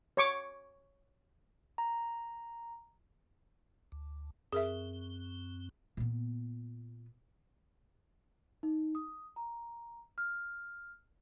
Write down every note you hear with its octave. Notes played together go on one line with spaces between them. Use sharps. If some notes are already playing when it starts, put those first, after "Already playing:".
C#5 C#6 D6
A#5
D2
F#2 C4 G#4 A#4 E5
A#2 B3
D#4
D#6
A#5
F6